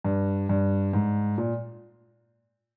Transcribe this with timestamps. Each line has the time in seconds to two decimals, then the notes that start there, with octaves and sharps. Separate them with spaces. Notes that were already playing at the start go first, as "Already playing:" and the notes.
0.04 G2
0.49 G2
0.93 G#2
1.38 A#2